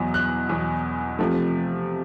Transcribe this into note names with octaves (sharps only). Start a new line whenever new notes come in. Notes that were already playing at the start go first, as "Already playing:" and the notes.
Already playing: E2 B2 F#3
F#6
E2 B2 F#3
C3 F3 A3